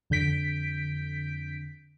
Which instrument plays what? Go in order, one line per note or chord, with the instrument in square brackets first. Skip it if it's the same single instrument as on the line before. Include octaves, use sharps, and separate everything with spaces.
[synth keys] F2 D3 G6 B6 D7